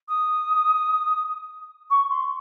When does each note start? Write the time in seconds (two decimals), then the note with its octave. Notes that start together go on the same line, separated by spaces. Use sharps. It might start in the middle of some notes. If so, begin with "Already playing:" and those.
0.08 D#6
1.90 C#6
2.09 C6